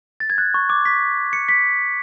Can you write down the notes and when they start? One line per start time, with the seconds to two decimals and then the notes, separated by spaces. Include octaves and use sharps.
0.20 A6
0.30 G#6
0.38 F#6
0.54 C#6
0.70 D6
0.85 B6
1.33 C#7
1.49 B6